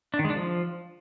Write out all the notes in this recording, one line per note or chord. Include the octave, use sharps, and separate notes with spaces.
D4
D#3
G#3
D4
F3